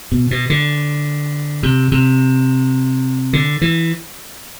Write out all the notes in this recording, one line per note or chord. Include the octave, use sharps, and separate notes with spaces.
B2
B2
D3
C3
C3
D3
E3